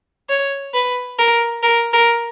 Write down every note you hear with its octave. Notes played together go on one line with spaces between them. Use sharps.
C#5
B4
A#4
A#4
A#4